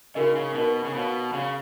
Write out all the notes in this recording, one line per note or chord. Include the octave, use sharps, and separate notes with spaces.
C#3 D#4 F#4 A#4 D#5
C#3
B2 D#4 F#4 A#4 D#5
C#3
B2 F#4 C#5 F5 B5
C#3 F#4 C#5 F5 B5